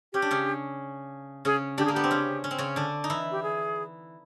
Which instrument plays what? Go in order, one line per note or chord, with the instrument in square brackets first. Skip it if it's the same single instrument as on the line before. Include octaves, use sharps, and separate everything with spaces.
[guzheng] C#4 [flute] G4
[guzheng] D4
C#3 C#4
[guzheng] C#3 C#4 [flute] G#4
[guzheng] D3 D4 [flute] G4
[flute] G#4
[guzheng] A#3
[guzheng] B3 [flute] G4
[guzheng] C4
C#3 C#4
C#4
C4
C#3 C#4
D3 D4
D#4
E3 E4
[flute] G4
G#4